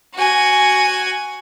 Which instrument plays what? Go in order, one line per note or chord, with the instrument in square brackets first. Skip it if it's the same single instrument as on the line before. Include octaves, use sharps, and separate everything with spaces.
[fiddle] F#4 G#5